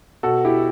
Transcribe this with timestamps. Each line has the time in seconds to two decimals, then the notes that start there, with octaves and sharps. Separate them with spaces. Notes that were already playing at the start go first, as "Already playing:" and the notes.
0.23 B2 F#4 A4
0.45 E4 G4